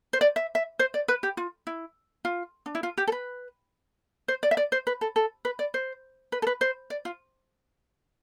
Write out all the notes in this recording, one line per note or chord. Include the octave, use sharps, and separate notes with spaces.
C5
D5
E5
E5
C5
D5
B4
G4
F4
E4
F4
D4
E4
F4
G4
A4
B4
C5
D5
E5
D5
C5
B4
A4
A4
B4
D5
C5
B4
A4
B4
C5
D5
F4